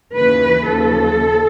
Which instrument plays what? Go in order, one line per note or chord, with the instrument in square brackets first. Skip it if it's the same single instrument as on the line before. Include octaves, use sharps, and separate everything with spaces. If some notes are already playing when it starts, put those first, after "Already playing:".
[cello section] D#2 C#3 E3 B4
D#2 C#3 F3 A4